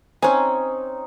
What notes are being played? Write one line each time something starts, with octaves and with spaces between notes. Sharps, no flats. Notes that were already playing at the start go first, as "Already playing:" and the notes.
C4 C#4 D#4 G#5